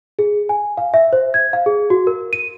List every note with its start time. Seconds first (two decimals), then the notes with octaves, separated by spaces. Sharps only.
0.19 G#4
0.49 G#5
0.78 F5
0.94 E5
1.13 C5
1.34 G#6
1.53 F5
1.66 G#4
1.90 F#4
2.07 A#4
2.33 D#7